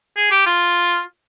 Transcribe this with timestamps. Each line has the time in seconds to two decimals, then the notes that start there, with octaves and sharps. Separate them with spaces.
0.16 G#4
0.31 G4
0.46 F4